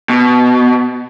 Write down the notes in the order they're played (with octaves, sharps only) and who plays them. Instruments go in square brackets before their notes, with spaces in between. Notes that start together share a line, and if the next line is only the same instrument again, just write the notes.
[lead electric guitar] B2